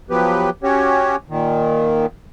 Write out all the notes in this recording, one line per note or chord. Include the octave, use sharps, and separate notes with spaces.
F3 F#3 B3 G4 B4
C#4 F#4 G4 C#5
A#2 D#3